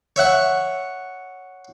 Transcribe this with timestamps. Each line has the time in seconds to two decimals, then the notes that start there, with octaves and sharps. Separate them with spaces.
0.16 C#5 E5 F#5 C#6